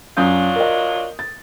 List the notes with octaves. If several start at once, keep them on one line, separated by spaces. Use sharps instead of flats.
F#2 F#3 D4 F4 D#6 G6
A#4 D#5
A6